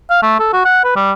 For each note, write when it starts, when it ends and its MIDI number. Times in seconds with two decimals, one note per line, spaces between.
0.10 0.22 77
0.23 0.39 57
0.39 0.51 69
0.53 0.65 66
0.65 0.84 78
0.84 0.93 71
0.96 1.12 55